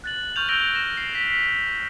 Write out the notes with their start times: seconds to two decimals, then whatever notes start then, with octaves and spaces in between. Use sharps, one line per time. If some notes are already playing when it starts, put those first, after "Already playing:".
0.04 F#6 A6 F#7
0.36 C#6 F6 G6 F7
0.49 E6 G6 A#6 D7 G7
0.75 A#6 E7
0.97 C7
1.15 B6